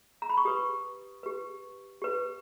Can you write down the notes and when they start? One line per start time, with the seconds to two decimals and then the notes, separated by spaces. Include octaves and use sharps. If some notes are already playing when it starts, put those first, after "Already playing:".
0.22 A#5
0.29 B5
0.37 C#6
0.45 G4 B4 D#6
1.23 G4 B4
2.02 G4 B4